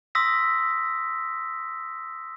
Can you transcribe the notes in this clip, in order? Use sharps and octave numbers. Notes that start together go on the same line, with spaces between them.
C6 D#6 E6 A#6 B6